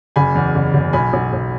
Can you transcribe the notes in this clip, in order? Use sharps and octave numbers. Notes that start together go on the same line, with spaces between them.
F#1 G#5 B5
E2
F#1
F#1
B1 G#5 B5
B1
B1